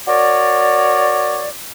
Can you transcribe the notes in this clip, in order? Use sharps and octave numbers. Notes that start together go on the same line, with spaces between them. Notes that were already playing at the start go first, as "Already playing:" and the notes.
F#4 A#4 C#5 D5